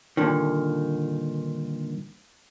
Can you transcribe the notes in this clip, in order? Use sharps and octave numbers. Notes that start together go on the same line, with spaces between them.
G2 A#2 D3 D#3